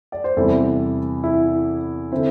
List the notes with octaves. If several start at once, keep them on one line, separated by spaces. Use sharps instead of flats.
D5
C5
E2 C3 G3 E4 A4
E4
D3 C4 E4